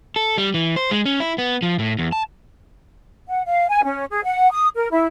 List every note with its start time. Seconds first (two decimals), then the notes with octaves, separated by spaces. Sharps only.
0.16 A4
0.38 G3
0.54 E3
0.76 C5
0.91 G#3
1.06 C#4
1.20 E4
1.38 B3
1.62 F3
1.79 A2
1.99 E2
2.12 A5
3.26 F#5
3.46 F5
3.69 G#5
3.83 C#4
4.10 G#4
4.24 F#5
4.52 D#6
4.75 A#4
4.91 E4